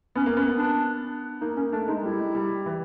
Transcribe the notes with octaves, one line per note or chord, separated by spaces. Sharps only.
B3 C#4
A#3
B3 C#4
D4
A#3 D#4
A#3 C#4
A3 D4
G#3 D#4
G3 E4
G3
E3